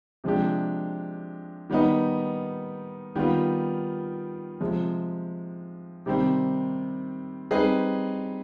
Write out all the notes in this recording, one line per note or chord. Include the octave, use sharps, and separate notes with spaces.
C3 F3 G#3 D4 G4
D#3 G3 B3 D#4
D#3 G3 B3 F4
C3 F3 G#3
C3 D#3 G3 C4
G3 C4 D#4 G#4 B4